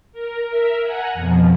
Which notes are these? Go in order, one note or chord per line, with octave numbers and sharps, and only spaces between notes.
A#4
A#4 E5
F#5 G#5 A#5
F2 B2 F3